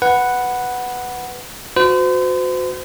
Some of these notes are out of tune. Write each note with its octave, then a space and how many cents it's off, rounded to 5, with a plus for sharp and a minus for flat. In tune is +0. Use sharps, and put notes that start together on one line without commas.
B4 +0 F#5 +0
F#4 -20 C5 -40